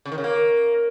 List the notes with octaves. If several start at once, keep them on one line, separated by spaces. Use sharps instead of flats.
C#3
D#3
C#3
A#3